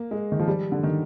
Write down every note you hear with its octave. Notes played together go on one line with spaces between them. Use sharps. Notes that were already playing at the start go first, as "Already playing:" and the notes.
Already playing: A#3
G#3
D#3
F3
G3
D3
D#3